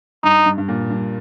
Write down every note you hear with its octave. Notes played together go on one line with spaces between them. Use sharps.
G2 D#4
G2
G2
A#2
G2